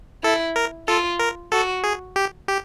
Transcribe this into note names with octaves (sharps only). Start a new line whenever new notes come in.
E4 A4
A#4
F4 A4
A#4
F#4 A4
G#4
G4
G4